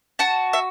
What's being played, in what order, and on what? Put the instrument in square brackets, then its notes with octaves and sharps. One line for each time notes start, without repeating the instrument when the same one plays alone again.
[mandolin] F#4 A5
E5